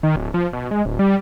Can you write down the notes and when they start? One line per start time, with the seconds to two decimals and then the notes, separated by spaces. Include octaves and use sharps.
0.03 D#3
0.16 D1
0.34 F3
0.53 B2
0.71 G#3
0.86 D1
0.99 G3